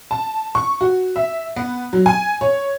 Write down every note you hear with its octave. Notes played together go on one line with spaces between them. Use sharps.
A5
C#6
F#4
E5
B3
F#3
G#5
C#5